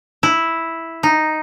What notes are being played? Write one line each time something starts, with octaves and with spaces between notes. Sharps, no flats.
E4
D#4